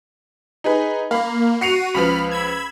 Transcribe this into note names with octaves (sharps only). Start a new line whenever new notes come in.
D#4 G#4 B4
A#3 F5 B5
F#4 C7 C#7 D#7 F7
C#2 F3 B4 B5 F6
B5 E6 G#6